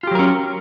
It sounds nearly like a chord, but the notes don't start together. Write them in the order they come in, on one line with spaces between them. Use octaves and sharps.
F4 G4 F#3 A#4 C#4